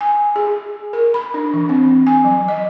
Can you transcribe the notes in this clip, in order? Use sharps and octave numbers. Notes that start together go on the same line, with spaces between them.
G#5
G#4
A#4
B5
D4
E3
C4
G#5
F#3
D#5